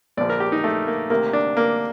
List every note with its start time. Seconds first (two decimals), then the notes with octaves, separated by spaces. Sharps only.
0.17 A#1 A#2 F3 D5
0.30 A#4
0.40 G4
0.52 D#4
0.64 A3
0.87 A#3
1.10 D2 C3 D#3 A#3
1.33 D4
1.57 A#3